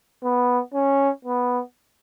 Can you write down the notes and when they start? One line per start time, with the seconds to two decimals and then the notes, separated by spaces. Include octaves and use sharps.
0.24 B3
0.74 C#4
1.25 B3